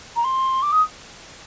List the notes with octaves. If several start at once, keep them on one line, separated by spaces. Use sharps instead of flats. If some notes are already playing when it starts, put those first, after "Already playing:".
A#5
C6
D6
D#6